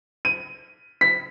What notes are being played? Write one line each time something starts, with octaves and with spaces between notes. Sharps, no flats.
D#7
B6